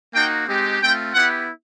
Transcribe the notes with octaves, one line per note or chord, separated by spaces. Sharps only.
A#3 D#4 F#4 G5
G#3 C4 D#4 G4
A3 C4 F4 G5
B3 E4 G4 F#5